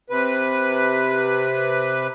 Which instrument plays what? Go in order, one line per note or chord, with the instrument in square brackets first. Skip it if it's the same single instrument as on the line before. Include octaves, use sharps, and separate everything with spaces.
[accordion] C3 B4